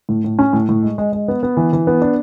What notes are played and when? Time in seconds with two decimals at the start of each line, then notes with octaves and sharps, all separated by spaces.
0.09 A2
0.24 A2
0.39 C#4
0.53 A2
0.69 A2
0.83 G#3
0.98 G#3
1.13 G#3
1.28 B3
1.43 B3
1.57 E3
1.73 E3
1.87 B3
2.02 D4